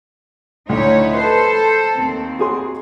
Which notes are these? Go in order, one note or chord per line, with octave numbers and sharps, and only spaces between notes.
D2 D#4 E4 C#5
A4 B4 C5
D#2 C4
F#4 G#4 C6